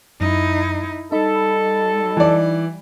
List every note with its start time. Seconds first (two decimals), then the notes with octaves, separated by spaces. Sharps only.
0.21 F#2 D#4 E4
1.12 G3 D#4 A4 D#5 B5
2.17 E3 D5